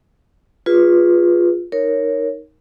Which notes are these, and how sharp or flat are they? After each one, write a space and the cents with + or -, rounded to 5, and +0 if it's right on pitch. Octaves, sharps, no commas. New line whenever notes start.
F4 +5 G#4 -20 B4 +0
D#4 +0 A#4 +0 C#5 +0